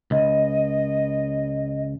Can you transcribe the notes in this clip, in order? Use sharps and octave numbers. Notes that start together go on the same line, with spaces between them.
C#2 D#5